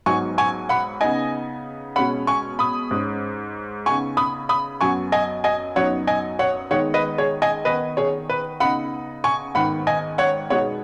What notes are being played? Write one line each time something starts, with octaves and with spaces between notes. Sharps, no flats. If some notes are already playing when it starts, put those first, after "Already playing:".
G#2 F#3 B3 D#4 G#5 C#6
G#5 C#6
F#5 B5
C#3 B3 D#4 D#5 G#5
B2 G#3 C#4 F#5 B5
G#5 C#6
B5 D#6
G#2 G#3 C#4
C#3 B3 D#4 G#5 C#6
B5 D#6
B5 D#6
F#2 F#3 B3 G#5 C#6
D#5 G#5
D#5 G#5
F#2 F#3 B3 D#4 C#5 F#5
D#5 G#5
C#5 F#5
D#3 G#3 B3 D#4 C#5 F#5
B4 D#5
G#4 C#5
D#5 G#5
D#3 B3 D#4 B4 D#5
G#4 C#5
B4
C#3 B3 D#4 F#5 B5
G#5 C#6
G#2 D#3 B3 F#5 B5
D#5 G#5
C#5 F#5
B2 G#3 B3 D#4 C#5 F#5